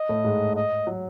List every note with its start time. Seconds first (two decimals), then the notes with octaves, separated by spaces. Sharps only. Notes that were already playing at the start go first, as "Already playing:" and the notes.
Already playing: D#5
0.09 A2 A3
0.24 G#2 G#3
0.56 D#5
0.87 F#3